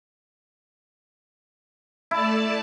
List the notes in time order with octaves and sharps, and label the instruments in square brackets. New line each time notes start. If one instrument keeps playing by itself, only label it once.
[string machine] A3 D5 A5 [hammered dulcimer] E4